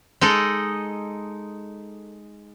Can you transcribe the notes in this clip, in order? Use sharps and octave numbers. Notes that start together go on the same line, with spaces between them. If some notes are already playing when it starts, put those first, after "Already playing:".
G#3 D#4 A4 D#5